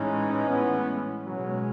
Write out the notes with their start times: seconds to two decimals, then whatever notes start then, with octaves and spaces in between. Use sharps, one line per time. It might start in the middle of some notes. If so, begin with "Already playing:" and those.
Already playing: A2 E3 G#3 C#4 D#4
0.48 B3
1.26 B2 F#3 G#3 C#4